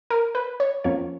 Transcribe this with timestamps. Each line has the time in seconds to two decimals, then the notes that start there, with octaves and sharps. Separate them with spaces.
0.10 A#4
0.35 B4
0.60 C#5
0.84 F2 F3 A#3 C#4 C#5